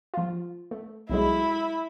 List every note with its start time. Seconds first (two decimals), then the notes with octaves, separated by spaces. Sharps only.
0.14 F3 F4
0.71 A3
1.09 B1 F#3 G#3 E4 B5